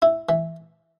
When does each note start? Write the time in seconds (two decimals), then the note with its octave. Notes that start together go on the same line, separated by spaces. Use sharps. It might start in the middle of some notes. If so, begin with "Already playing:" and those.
0.02 E4
0.29 E3